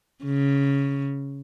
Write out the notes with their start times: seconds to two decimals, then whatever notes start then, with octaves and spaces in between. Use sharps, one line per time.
0.24 C#3